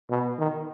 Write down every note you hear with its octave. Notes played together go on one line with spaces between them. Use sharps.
B2
D#3